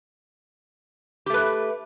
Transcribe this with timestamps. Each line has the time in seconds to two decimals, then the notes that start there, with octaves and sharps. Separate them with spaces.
1.26 G4
1.30 A3
1.34 B4